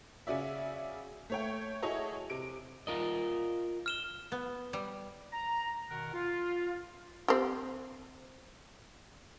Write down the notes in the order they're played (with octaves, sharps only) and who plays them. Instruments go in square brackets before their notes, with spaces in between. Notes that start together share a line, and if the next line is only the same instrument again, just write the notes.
[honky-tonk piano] C#3 C#4 F#4 D5 E5
A3 C#5 G5
E4 F#4 G#4 A4 C#5 D#5
C3 D7
[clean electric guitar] F4 A#4 D#5
[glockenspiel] F6 E7 G7
[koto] B3
G3
[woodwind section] A#5
B2 D#3 A#4 F#5
F4
[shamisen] C4 G4